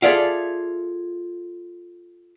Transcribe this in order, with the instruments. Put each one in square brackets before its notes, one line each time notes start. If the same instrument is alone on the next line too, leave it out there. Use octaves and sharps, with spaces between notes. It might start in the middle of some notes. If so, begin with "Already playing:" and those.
[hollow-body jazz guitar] F4 G#4 A4 D5 E5 F5